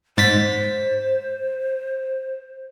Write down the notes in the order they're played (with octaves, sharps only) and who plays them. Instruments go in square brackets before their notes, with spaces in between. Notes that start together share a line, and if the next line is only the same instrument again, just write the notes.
[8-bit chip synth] G#2 A6 B6 [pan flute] C5